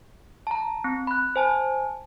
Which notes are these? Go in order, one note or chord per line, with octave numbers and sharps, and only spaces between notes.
A5 A#5
C4
B5 F#6
C5 G#5 A5